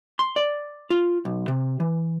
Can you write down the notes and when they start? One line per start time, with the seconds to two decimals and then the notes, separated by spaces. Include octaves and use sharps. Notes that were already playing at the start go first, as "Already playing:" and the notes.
0.19 C6
0.36 D5
0.90 F4
1.25 B1
1.48 C3
1.80 E3